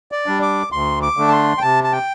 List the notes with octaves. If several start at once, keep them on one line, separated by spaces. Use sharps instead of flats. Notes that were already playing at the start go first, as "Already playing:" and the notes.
D5
G3 D4
D6
D2 C6
D6
D3 A3 D4
A5
C6
G5
C3 A5
A5
G5